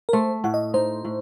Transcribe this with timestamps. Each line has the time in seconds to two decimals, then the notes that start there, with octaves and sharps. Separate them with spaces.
0.09 A#4
0.13 A3 C5
0.44 A2 F#5
0.54 D#5
0.74 D#4 C5
1.05 A2